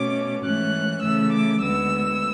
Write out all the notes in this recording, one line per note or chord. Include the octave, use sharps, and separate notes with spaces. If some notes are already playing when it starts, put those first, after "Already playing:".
Already playing: B2 A3 C#4 D6
G#2 E3 A3 C#4 F#6
C#3 E3 A3 E6
D6
D2 D3 G#3 B3 E6